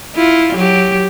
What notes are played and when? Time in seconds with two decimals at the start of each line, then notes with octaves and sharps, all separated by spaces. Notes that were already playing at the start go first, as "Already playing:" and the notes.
0.16 E4 F4
0.55 F#3 G4